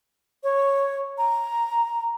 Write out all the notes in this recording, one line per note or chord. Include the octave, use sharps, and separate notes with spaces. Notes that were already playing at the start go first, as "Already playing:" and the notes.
C#5
A#5